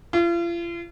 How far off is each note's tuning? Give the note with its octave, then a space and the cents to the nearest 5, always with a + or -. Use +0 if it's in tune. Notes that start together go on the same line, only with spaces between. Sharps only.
F4 -40